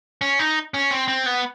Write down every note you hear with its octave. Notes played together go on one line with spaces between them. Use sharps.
C#4
D#4
C#4
C4
C4
B3